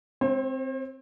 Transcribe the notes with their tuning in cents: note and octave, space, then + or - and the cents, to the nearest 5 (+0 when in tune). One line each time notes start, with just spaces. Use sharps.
C4 +0 C5 +45